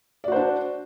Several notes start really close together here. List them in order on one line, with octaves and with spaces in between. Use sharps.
D5 F#4 C5 D4